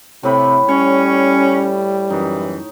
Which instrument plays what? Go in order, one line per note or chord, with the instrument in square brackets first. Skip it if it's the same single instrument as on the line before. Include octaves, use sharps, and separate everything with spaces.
[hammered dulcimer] A2 E4 B5 [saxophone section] C3
[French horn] G3 [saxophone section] C#4 [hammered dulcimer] C#5
[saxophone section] F#2 E3 [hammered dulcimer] D#4